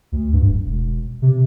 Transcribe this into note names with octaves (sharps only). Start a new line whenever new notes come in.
D2
G2
D1
E1
C3